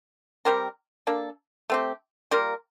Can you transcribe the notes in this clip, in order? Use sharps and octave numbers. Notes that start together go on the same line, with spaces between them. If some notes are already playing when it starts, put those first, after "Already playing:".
G3 C4 G4 A#4
A#3 D4 A4
A3 C4 G4
G3 A#3 F4 A#4